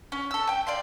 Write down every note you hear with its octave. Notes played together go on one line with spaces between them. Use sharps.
C#4
A4 E6
G5
D5 F5 C6